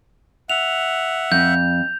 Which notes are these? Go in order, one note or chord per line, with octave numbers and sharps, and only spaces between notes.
E5 F#5 F7
F2 G6